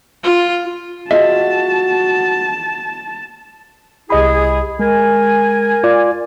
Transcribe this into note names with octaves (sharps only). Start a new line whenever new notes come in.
F4
F4 F#4 G#4 D#5 E5 A5
C2 E4 G4 G#4 D#5 B5
G#3 A#4 G#5
F4 D5